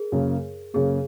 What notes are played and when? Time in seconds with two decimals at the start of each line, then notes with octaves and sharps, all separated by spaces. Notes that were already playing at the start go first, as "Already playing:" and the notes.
Already playing: G#4 A#4
0.12 F#2 C#3 A#3
0.74 F#2 C#3 A#3 G#4